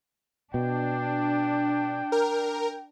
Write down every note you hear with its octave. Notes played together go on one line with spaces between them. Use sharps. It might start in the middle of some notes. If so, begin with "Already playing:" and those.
B2 D4 G5
A#4